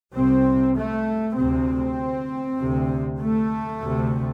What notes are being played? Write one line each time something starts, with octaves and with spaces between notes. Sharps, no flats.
C2 C3 C4
A3
D2 C3 C4
D2 C3
A3
D2 C3